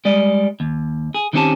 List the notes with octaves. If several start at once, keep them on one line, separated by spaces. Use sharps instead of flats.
G3 G#3 D5 D#5
D#2
G#4
D#3 F#3 C4 C#4 G4 A5